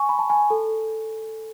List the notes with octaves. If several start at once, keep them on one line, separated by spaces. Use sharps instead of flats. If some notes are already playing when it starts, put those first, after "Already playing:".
Already playing: G#5 C#6
B5
A5
G#5
A4